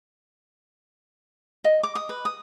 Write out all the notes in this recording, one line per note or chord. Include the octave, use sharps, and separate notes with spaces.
D#5
D6
D#6
B4
D#6